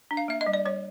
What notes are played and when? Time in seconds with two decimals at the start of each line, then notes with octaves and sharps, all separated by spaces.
0.11 D4
0.17 F5
0.28 A#3 E5
0.41 D#5
0.46 G3
0.53 D5
0.65 G3 C#5